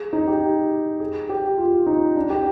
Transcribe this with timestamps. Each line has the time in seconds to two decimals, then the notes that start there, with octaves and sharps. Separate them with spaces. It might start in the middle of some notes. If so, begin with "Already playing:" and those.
Already playing: G#4
0.13 D#4
0.27 G4
1.00 G#4
1.29 G4
1.58 F4
1.86 D#4
2.16 D4
2.30 G4